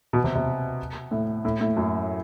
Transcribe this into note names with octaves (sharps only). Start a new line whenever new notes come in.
B2
C3
C3
A2
A2
A2
F#2